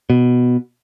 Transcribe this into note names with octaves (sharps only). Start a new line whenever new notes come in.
B2